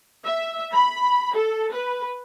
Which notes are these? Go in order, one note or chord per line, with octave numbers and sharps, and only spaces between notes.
E5
B5
A4
B4